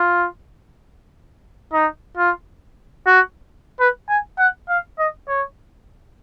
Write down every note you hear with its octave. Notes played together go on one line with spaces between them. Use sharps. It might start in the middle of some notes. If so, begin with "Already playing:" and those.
Already playing: F4
D#4
F4
F#4
B4
G#5
F#5
F5
D#5
C#5